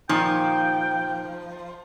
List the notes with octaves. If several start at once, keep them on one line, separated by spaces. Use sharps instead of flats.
A#2 D#3 F3 D#4 G5